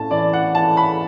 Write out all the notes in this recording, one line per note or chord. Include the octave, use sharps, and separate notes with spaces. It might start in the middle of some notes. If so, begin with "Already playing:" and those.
Already playing: A2 C#4 A5
E3 D5
F#5
E3 A5
B5